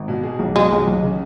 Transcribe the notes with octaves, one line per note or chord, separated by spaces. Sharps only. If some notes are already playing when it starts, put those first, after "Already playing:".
Already playing: G#1
B2
G#4
B1
B2 G#3
B1
B1
C#3